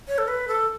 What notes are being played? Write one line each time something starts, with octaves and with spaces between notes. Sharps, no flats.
C#5
A4
B4
A4